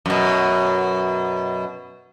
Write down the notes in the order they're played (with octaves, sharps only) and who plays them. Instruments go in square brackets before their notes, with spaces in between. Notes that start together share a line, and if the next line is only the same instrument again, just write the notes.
[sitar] F#2 B2